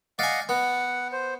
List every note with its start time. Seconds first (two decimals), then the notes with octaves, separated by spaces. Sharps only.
0.19 D5 D#5 F5 F#5 G#5
0.49 B3 F#5
1.12 C5